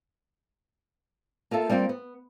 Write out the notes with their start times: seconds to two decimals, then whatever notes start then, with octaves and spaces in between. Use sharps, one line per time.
1.51 A#3 F4 A4 E5
1.69 G3 A#3 C4 F4
1.89 B3